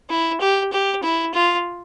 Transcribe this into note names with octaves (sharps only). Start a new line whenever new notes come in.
E4
G4
G4
E4
F4